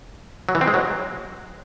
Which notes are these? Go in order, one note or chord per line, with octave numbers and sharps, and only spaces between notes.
F#3
E3
C4
G#3
F#3